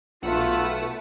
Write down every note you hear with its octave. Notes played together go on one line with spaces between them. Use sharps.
B1 A3 F4 B4 F#5 E6